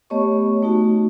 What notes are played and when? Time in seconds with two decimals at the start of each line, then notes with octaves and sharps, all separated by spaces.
0.10 A3 B3 G4 C#5 D#5 C#6
0.62 A3 D#4 F#4